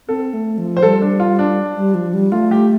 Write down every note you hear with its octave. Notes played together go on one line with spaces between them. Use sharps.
C4 A4
A3
F3
C5
G3 A4
D4
F4
D4
G3
F3
G3
A3 F4
G4